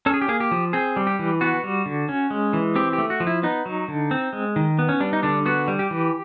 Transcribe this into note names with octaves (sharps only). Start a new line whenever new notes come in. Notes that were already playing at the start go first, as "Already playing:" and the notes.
C#4 A4
G#4
G4
A#3 G#4
G4
F3
C4 G#4
G3
G4
E3
B3 F#4
G3
D3
C#4
G#3
E3
C4 G4
G4
A3
F#4
F3
E4
B3 D#4
F#3
D3
C4
G#3
D#3
B3
C#4
G3 D4
D#4
D3 D4
B3 F#4
G3
G4
E3